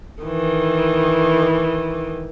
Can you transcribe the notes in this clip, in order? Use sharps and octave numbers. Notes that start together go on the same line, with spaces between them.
D#3 E3